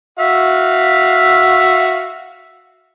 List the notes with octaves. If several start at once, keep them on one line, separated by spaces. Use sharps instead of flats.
F#4 E5 F5